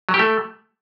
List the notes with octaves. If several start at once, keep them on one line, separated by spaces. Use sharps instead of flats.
F#3
G4
A3